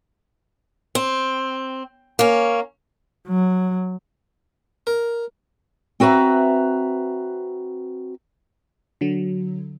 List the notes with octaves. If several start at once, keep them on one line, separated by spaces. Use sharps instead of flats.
C4
A#3 C#4
F#3
A#4
C4 F#4 B4 E5 A#5
D3 F#3